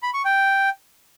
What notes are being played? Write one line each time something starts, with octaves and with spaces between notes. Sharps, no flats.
B5
C#6
G5